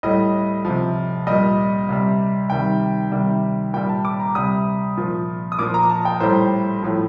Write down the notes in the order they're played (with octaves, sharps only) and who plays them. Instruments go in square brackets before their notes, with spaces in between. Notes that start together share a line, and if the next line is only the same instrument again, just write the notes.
[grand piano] A2 G3 D#5
C3 F3
A#2 G3 D#5
C3 G3
C3 D#3 G3 G5
C3 D#3 G3
A#2 G5
G3
A5
D6
A#5
C3 G3 D#6
A#2 F3
D#6
A#2 F3 D6
A#5
A5
G5
A2 G3 C5
A2 F3